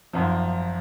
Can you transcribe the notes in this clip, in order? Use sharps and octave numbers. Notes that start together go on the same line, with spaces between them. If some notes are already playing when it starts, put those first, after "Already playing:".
G#1 F#2 F3